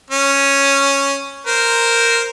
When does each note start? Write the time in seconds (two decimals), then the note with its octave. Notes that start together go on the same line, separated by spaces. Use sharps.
0.10 C#4
1.47 A#4 C5